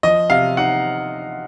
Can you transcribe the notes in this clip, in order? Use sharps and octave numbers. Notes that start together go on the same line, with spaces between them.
F3 D#5
C3 F5
D#4 F#5